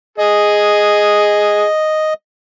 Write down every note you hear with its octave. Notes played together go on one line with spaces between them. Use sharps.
G#4 D#5